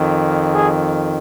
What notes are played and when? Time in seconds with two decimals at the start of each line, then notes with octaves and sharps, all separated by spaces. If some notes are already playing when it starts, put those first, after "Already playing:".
Already playing: F2 D#3
0.55 G#4